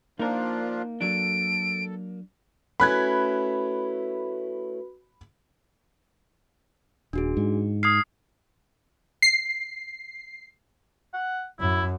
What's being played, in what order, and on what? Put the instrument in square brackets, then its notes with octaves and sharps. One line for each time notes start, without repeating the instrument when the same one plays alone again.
[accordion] F3 D4 F4 [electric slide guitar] A#3 [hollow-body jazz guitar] D#4 A#4
[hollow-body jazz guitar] F#3 D4 [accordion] A4 [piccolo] D7
[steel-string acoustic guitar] A3 C#4 E4 [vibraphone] F#4 B4 [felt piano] B5 F#6 G#6
[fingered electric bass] D#1 [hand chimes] D4 F#4 G#4
[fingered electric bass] G#2
[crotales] D#6 C7 [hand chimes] F6 G#6
[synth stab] C7
[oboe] F#5
[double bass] F#2 [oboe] E4